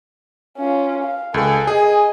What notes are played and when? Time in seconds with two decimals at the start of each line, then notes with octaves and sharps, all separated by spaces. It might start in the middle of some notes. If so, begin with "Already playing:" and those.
0.57 C#4 F4
1.03 F5
1.34 C#2 A4 G#5
1.67 G#4 D#5 G#5